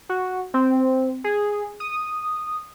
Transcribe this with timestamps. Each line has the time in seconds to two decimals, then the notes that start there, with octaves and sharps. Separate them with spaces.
0.09 F#4
0.54 C4
1.24 G#4
1.80 D#6